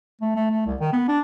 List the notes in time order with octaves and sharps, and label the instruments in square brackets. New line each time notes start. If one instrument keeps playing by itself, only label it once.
[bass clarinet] A3
A3
A3
C2
D#3
B3
D4